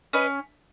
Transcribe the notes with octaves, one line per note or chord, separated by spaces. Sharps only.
C#4 B4 D#5